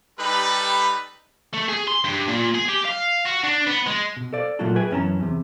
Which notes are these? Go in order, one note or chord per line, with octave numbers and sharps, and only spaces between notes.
G3 D#4 G4 A4 B4 B5
A3
G#4
C6
G2
A#2
G#4
G4
F5
F#4
D4
B3
G#3
B2
A4 C5 D5 F5
A#2 F#3 A3 F4 F#4 A4
G#4 B4 E5 G5 G#5
F#2 E3 C#4 D4 A5 A#5
E2 C3